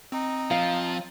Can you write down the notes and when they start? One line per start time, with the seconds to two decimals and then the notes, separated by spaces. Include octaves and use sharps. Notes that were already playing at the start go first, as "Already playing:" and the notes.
0.12 C4 D#4
0.51 F3 F5